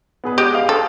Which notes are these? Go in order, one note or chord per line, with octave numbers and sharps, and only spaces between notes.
B3 G#4 B4
G#3 G4 D#5
F5 F7
A4